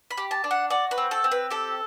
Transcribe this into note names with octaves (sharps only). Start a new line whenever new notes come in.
B5
G4
A5
D4
F#5
F#4 D5
B4
C4
A4
C4
B4
G4 A4